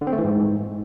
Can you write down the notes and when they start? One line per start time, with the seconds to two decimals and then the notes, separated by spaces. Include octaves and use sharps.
0.01 D3
0.07 C4
0.13 A3
0.18 E3
0.24 G#2